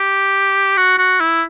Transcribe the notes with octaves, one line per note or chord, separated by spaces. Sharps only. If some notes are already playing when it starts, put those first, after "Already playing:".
Already playing: G4
F#4
F#4
E4